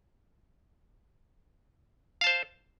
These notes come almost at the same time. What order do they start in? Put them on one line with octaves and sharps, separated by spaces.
F5 A5 C5